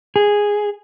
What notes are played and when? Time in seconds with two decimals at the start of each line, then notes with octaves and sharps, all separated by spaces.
0.16 G#4